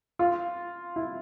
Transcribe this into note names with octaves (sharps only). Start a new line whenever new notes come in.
F4
E4